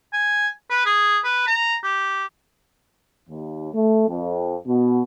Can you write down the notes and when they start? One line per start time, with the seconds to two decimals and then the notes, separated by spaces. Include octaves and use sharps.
0.13 G#5
0.70 B4
0.86 G#4
1.24 B4
1.48 A#5
1.84 G4
3.29 D#2
3.74 A3
4.08 F2
4.66 B2